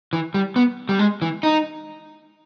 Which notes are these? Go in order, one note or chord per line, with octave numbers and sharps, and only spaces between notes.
E3
G3
B3
G3
G#3
E3
D#4